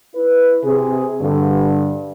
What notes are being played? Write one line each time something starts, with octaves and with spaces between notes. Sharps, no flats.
E4 B4
C3 G#4
G2 D3